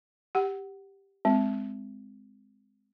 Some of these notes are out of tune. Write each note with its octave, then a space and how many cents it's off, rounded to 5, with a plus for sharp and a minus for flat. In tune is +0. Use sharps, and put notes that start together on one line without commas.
G4 +0 F#5 +15
G#3 +0 C4 -15